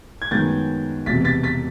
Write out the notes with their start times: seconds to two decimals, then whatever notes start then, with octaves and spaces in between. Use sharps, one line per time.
0.22 G#6
0.31 F#2 D#3 G#3 B3 G6 A6
1.06 E1 E2 C3 A6 B6
1.24 A6 B6
1.43 A6 B6